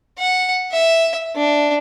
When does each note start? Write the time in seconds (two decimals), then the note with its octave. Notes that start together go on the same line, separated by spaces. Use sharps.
0.19 F#5
0.72 E5
1.36 D4